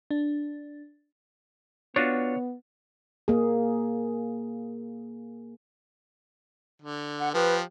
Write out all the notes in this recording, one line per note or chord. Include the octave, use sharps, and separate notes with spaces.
D4
B3 D4 F4 F#4 C#5
A#3 G#4
D3
F#5
F3 G4 B4